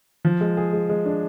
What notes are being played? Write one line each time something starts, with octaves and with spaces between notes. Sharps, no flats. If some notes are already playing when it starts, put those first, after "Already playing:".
F3
G#3
G#4
G#3
G#3
D4